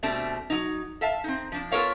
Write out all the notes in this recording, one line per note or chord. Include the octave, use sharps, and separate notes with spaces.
B2 G3 A3 C4 D4
F#3 D#4
A4 E5 F5 A5
C4 D#4
F3 D4
B3 F4 A4 A#4 C#5 F5